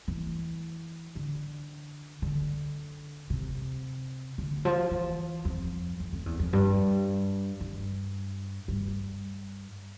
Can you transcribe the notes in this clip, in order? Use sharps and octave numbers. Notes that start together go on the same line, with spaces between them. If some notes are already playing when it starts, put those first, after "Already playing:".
E3
D3
D3
C3
D3
F3
E3
F2
F2
F2
E2
F2
G2
G2
G2